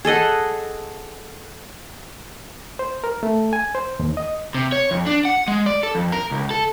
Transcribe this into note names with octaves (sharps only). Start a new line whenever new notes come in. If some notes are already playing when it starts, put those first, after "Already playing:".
G#4 A4 D#5 F#5
C5
A#4
A3
G#5
C5
D#2
D#5
C3
C#5
F2
D4
F#5
G#3
D5
A4
F2
A#4
C#2
A4